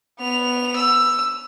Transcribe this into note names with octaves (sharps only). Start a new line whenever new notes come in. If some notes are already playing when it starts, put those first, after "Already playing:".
B3 F7
E6